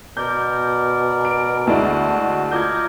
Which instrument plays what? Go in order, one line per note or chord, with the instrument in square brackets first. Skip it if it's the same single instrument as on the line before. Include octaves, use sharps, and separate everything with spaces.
[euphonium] B2 [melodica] A#4 D5 [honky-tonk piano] G6
[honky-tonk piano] D7
[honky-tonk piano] D2 G#3 D4 [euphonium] E4 [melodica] F#4 A5
[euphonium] F4 [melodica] A#4 D5 D#5 [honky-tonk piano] G6 G#6